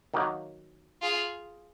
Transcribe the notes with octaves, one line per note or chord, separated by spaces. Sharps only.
D#3 F#3 A#3 D#4
F4 G#4